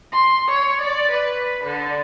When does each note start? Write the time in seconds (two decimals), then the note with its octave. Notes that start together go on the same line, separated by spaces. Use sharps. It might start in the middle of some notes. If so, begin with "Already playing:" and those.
0.13 C6
0.49 C#5
0.81 D5
1.11 B4
1.64 D3